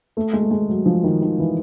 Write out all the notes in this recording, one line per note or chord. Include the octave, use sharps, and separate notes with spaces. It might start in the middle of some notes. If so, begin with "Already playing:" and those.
A3
G#3
A3
G#3
F#3
F3
D#3
D#3
E3